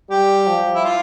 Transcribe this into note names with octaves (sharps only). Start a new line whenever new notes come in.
G3 G4
F3
E4
F4